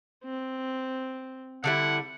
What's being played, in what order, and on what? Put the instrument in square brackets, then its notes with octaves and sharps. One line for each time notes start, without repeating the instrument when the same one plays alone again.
[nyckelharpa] C4
[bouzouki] D3 G3 E4 [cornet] F#5